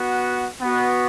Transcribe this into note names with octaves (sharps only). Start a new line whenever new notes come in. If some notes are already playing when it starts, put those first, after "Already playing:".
Already playing: B3 F#4
B3 F#4